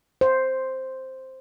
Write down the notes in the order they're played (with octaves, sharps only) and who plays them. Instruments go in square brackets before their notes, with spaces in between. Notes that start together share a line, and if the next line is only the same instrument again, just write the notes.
[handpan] C5